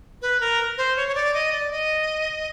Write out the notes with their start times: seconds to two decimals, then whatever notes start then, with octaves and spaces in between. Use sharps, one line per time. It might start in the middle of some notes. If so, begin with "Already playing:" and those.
0.22 B4
0.41 A#4
0.78 C5
0.97 C#5
1.08 C#5
1.15 D5
1.34 D#5
1.52 D5
1.71 D#5